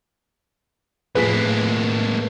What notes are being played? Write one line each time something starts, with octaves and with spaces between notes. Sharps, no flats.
F2 A2 G#3 A#3 G#4 B4 B6